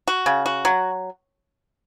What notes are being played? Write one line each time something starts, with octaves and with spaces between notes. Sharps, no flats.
F#4
C#3
F#4
F#3